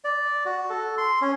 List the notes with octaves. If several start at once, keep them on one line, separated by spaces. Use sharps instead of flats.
D5
F#4
A4
C6
C#4